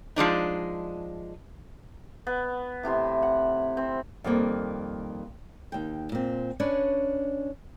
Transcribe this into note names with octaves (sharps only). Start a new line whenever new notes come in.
F3 G#3 D4 D#4
B3
A2 C3 E4 C6
F#5
C4
F2 D#3 G3 A#3
D#2 G5
A#2 C4
C#4 D4 B4 C#5 D5